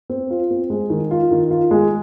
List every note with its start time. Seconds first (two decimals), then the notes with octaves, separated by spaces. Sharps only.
0.10 C4
0.30 F4
0.51 C4
0.70 G#3
0.90 D#3
1.11 F4
1.31 D#3
1.51 F4
1.71 G#3